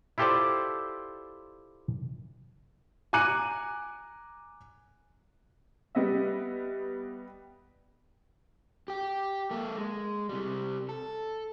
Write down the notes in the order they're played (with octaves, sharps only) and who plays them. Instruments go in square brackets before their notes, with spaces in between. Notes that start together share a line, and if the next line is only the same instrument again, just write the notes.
[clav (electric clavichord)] E4 F4 G4 A4 C5 D5
[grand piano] G#5 A#5 D6 F#6 C#7 D#7
[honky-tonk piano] G3 B3 D#5 E5
[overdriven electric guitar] G4 G5
A#3 A4
G#3
C3 G3
A4